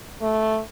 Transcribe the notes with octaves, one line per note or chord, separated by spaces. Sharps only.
A3